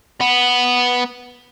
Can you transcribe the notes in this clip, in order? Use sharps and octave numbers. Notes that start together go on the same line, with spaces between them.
B3